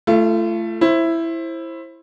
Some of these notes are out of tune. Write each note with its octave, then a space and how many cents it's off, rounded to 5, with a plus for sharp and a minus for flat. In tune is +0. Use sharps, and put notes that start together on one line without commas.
A3 +0 F4 -40
E4 +5 C5 +25